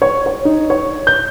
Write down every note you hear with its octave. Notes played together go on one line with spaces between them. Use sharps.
C#5
C#5
D#4
C#5
G6